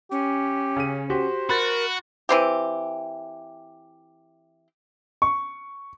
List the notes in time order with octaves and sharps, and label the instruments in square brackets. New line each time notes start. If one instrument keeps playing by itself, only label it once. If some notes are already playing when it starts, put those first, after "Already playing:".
[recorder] C#4 [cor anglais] G4
[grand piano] C#3 D#7
[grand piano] F#4 G4 [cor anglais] C5
[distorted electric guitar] F#4 [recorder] A#4 [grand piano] B5 F#6 A6
[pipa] E3 C4 G4
[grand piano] C#6